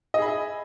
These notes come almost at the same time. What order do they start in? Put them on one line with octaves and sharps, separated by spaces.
D#5 G#4 B5 E5